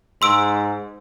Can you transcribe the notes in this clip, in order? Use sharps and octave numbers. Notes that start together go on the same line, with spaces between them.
G#2 C6 E6 D7